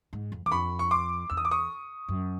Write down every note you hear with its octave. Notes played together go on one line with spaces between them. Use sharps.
G#2
F2
E2 D6
F2 B5 C#6
C#6
C6 D6
E2 E6
D#6
D6
C#6 D#6
F#2